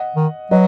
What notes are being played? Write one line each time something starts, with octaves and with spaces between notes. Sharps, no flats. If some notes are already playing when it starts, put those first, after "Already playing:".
Already playing: D#5 F#5
D#3
F#3 B4 D#5